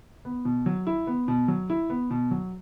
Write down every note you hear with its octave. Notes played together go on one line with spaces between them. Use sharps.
B3
B2
F#3
E4
B3
B2
F#3
E4
B3
B2
F#3